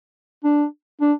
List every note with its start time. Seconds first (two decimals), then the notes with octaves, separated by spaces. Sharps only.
0.44 D4
1.01 D4